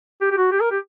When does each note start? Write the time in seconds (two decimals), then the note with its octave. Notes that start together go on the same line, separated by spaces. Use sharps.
0.21 G4
0.32 G4
0.37 F#4
0.52 G4
0.60 A#4
0.71 G4